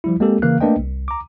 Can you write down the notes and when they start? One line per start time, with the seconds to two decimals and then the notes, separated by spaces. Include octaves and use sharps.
0.04 F3 G3 E4
0.20 G#3 A#3 C4 G4 A4
0.42 C#3 E3 A#3 F5 F#6
0.61 A3 A#3 D4 B4 D#5 G5
0.79 C2
1.08 A#5 D6